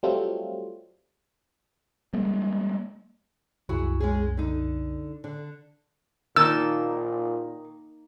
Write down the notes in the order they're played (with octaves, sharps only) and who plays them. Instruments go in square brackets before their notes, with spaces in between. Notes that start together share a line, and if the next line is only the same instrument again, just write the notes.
[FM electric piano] F#3 G3 A3 C4 F4
[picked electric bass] G3 G#3 A#3
[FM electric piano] C2 F#2 [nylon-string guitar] E4 F#4 G#4
[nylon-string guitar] G#3 C#4 G#4
D3 D#4
D3 D4
[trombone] A#2 [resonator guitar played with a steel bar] D#3 [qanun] A#3 D#4 A5 [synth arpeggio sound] E6